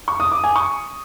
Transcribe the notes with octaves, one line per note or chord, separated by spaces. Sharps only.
C#6
D#6
D6
G#5
C#6